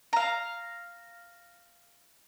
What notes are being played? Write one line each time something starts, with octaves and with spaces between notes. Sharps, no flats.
F5 A#5